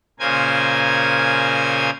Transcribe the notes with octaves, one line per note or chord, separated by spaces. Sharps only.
A#2 C#3 A#4 C5 G#5 G#6